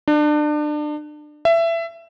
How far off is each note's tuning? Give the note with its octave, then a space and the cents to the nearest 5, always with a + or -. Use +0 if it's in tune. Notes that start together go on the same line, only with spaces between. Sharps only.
D4 +30
E5 +20